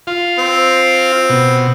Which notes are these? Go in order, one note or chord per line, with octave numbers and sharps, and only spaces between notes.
F4
C4
B2